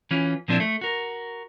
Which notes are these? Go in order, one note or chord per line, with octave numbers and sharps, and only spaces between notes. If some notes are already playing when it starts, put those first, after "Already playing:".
E3 C#4 F4
A#2 F3 C4 D4 E4
A3
F#4 A#4